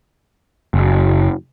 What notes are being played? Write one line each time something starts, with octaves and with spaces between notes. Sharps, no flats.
F#1